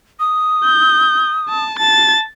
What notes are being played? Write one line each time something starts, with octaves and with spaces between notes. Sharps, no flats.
D#6
G6
A5
A5 A6